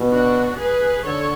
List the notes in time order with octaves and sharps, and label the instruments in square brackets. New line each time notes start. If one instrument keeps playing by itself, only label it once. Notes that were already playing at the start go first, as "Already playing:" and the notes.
Already playing: [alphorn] B2
[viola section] D4 F#4
G#4 B4
[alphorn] D3 [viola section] A4 C#5